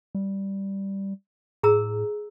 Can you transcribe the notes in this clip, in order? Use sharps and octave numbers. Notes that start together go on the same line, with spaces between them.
G3
A2 G#4 A#5 E6